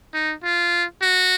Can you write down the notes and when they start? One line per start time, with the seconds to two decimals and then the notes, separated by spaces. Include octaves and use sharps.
0.14 D#4
0.44 F4
1.02 F#4